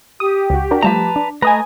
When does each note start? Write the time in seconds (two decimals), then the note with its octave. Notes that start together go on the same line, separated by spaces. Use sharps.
0.20 G4 D#6
0.50 C#2 F#4
0.71 D4 F#4 A#4
0.83 F3 G3 A3 B4 A5 A#5
1.16 D4
1.42 A3 B4 D#5 G#5 A#5